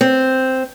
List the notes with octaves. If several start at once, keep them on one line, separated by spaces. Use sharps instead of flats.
C4